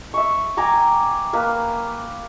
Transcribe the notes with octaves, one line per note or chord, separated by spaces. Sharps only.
E5 C#6
G5 G#5 A#5 D6
A#3 B4